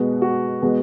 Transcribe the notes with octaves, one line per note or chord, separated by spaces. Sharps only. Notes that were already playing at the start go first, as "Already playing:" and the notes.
Already playing: B2 G#3 B3 F#4
F#4
B2 G#3 B3